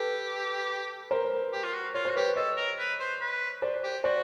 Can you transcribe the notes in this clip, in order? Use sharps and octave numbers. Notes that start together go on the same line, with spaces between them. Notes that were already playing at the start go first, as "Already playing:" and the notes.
Already playing: G4 A4 B4
A#4 C5
G4
F4
F#4
F4 C#5
F#4 C5
G4 B4 C#5
A4 C#5 D#5
A#4
B4
C5
B4
C5 D5
G4
F#4 C5 D5